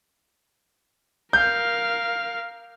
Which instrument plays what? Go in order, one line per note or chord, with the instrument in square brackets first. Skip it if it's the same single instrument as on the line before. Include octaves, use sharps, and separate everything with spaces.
[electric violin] A#4 F5 [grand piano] G6